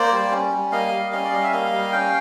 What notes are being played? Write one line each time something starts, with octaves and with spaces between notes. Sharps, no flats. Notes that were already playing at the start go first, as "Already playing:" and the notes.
Already playing: A#3 C5 D5
G3
C#4
G3
A#3 D#5 F5
G3
C#4 D#5 F5
D5
G3 D#5
E5
A#3 D#5 F5
G3
C#4 F5 G5